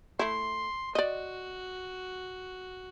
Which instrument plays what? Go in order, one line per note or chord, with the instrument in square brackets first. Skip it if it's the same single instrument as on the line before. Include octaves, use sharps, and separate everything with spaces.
[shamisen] A3 E4 [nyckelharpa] C6
[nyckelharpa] F#4 [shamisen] D5 D#5